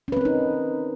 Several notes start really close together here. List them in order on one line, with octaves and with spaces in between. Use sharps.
C#4 B4 C4 A#4 D#4